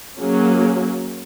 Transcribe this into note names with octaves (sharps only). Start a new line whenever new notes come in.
F#3 A#3 C#4 G#4